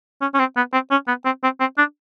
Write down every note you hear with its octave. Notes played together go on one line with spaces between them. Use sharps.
C#4
C#4
C4
B3
C4
C#4
B3
C4
C4
C4
D4